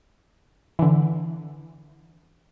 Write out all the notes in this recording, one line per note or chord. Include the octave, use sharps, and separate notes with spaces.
D3 E3